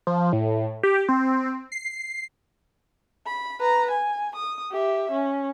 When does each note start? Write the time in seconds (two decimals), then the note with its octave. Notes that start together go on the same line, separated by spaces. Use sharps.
0.07 F3
0.33 A2
0.83 G4
1.09 C4
1.72 C7
3.26 B5
3.60 B4 A#5
3.91 G#5
4.36 D#6
4.71 G4 E5
5.11 C#4